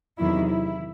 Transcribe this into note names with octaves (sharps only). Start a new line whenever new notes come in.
E2 C3 D#3 F#3 E4
E4